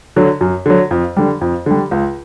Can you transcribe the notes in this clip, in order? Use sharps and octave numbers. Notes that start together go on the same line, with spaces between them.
D3 F#3
F#2
D3 F#3
F2
D3 G3
F2
D3 G3
C#2